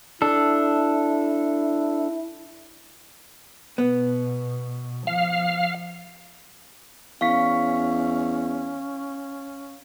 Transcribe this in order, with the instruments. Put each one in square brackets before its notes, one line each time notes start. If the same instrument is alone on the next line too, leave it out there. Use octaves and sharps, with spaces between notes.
[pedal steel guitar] D4 A4 [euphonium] E4
[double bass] B2 [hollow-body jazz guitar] B3
[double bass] F3 [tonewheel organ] F5
[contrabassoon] E2 [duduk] C#4 [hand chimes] F5 C#6 B6